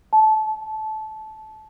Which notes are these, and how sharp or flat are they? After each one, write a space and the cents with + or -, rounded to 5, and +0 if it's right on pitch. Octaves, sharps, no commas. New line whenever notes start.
A5 -20